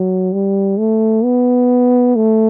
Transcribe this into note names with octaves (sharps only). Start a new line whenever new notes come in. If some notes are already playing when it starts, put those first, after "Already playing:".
Already playing: F#3
G3
A3
B3
A3